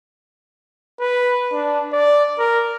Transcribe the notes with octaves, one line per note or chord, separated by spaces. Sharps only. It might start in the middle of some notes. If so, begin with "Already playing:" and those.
B4
D4
D5
A#4